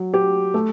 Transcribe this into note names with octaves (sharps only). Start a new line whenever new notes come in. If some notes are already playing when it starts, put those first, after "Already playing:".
Already playing: F#3
G4
A3